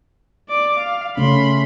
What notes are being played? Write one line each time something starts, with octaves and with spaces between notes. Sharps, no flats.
D5 D6
F5
C#3 A3 C#4 B5 C6